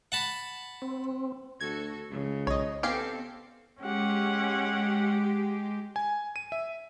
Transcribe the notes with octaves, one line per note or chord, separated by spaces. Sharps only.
F#5 A5 B5
C4
D2 F#4 A4 G#6
C#2 C#3
B1 C#5 D#5
B3 C4 G4 A4 F5 G5 G#5 C7
G#3 C#4 G4 F#5
G#5
D#7
E5